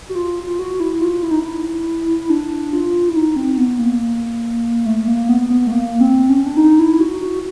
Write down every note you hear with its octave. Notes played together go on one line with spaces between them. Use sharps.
F#4
F4
F4
F#4
E4
F4
E4
D#4
E4
D4
F4
E4
D#4
C4
B3
A#3
A3
A#3
B3
B3
A3
A#3
C4
C#4
D4
D#4
E4
F#4
F#4